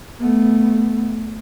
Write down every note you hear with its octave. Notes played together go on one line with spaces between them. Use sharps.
A3 B3